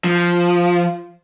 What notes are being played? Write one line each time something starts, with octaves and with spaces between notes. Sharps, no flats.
F3